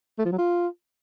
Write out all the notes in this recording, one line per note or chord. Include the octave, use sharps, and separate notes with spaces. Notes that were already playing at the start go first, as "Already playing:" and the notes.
A3
F3
F#3
F4